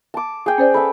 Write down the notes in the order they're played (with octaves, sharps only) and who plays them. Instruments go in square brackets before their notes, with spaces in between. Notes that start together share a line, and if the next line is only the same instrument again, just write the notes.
[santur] A5 D6
G#4 G5
[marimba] C#4 C5 D5
[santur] A4 B4 E5 [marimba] B5